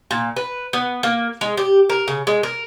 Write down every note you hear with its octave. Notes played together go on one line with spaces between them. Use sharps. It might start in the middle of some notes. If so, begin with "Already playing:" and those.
A#2
B4
B3
A#3
G#3
G4
A#4
C#3
G#3
A#4